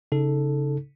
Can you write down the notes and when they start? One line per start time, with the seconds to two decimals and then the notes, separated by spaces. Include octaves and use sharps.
0.12 C#3 D#4 A4